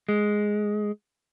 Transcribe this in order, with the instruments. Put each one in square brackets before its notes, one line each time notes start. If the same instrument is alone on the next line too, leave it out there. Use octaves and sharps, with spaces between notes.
[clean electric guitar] G#3